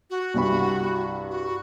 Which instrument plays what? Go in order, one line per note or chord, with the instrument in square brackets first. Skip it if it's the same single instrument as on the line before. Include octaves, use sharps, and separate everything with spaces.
[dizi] F#4
[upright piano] C2 G2 B5
[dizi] F#4